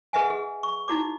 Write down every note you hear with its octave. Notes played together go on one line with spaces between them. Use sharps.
G#4 B4 D#5 E5 F#5 G#5
G#4
C#6
D#4 E4 F#4 D5 D6